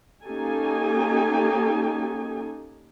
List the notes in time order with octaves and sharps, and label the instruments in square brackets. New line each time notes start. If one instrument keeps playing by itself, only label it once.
[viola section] A#3 C#4 D#4 G4 A4 G#5